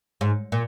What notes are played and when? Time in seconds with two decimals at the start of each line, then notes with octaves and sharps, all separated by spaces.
0.21 G#2
0.52 A#2